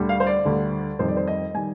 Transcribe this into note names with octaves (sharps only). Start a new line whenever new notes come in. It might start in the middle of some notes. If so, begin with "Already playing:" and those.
Already playing: D2 D3 G3
F5
C5
D5
D2 D3 G3
F2 D#3 G3 C5
D5
C5
D#5
D#3 G3 G#5